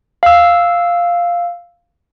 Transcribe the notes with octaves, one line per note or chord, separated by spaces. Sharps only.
F5 E6